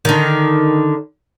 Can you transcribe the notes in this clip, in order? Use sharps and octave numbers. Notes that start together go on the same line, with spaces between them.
D3 D#3